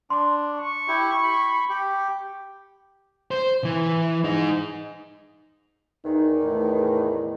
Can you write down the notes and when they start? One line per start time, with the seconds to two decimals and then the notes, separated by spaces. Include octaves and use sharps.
0.10 D4 C6 D6
0.55 C#6
0.88 E4 G4
1.23 B5
1.69 G4
3.31 C5
3.64 E3
4.24 D#4 G#4
6.05 E2 D#3 D#4
6.45 A2